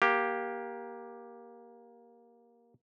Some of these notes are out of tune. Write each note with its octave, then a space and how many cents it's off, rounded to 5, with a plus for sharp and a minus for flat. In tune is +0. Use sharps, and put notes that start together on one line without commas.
A#3 +15 G4 +0